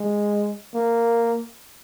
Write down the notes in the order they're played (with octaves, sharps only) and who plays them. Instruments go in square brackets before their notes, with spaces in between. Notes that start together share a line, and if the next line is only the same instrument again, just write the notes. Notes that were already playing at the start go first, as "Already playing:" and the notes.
Already playing: [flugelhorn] G#3
A#3